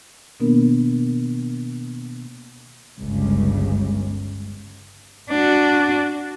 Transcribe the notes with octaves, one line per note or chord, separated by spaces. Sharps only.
B2 D#3 A#3 B3 D4 A#4
G1 C#2
D4 F#4